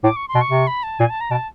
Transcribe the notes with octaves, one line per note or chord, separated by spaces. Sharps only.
A2 D6
C#6
C6
B2
C#6
C3
B5
A5
A#2 G#5
A5
A#5
B2 A5